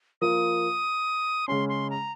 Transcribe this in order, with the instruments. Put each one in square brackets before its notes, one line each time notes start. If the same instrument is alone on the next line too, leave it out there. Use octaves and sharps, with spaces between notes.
[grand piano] F3 A#3 F4 [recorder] D#6
[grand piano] C#3 G#3 C#4 [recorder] C6
[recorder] C6
A#5